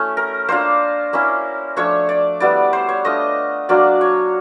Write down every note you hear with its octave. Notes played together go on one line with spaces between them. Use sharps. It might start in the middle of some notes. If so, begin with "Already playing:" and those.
Already playing: A3 C#4 E4
A#4
A#3 D4 F4 C5
A#3 C#4 E4
F3 A3 D4 C#5
D5
G3 B3 E4 D5
C5
C#5
A3 D4 F4 D#5
F#3 A#3 D4 F4 D5
C#5